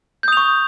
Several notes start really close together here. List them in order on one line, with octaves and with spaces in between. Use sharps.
G6 D#6 F7 C#6